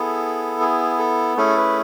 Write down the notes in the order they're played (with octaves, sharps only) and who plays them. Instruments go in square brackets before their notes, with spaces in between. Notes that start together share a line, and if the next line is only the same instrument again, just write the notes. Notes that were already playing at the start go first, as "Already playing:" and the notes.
Already playing: [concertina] B3 E4 G#4 A4
G#4
A4
A3 C#4 E4 G#4 A4
B4